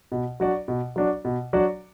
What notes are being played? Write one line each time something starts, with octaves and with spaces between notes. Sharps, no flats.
B2
F#3 D4 F#4 D5
B2
F#3 D4 F#4 D5
B2
F#3 D4 F#4 D5